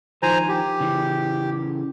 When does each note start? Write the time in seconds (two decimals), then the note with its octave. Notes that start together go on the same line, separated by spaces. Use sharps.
0.23 D#3 F3 C5 G#5 A#5
0.49 G4
0.80 C#3 E3 C#4